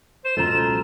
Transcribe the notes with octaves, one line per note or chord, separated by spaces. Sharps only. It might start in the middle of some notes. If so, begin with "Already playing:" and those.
C5 E7
F#1 C#2 B2 F4 A4 A#5